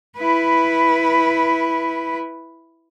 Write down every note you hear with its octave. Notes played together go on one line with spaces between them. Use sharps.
E4 B4